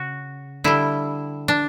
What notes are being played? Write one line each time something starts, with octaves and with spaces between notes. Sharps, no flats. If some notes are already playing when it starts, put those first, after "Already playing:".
Already playing: C#3 F#4
D3 G3 E4
D4